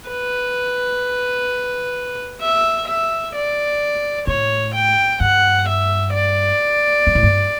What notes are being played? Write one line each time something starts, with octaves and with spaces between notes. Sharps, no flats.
B4
E5
E5
D5
A2 C#5
G5
G2 F#5
E5
D5
G2
A2
G2